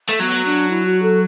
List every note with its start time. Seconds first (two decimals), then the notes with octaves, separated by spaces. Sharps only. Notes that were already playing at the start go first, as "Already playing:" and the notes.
0.09 A3
0.20 F#3 B3
0.45 D4
0.70 E4
0.86 F#4
1.02 A4